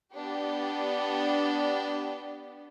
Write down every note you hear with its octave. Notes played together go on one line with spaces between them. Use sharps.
B3 D4 G4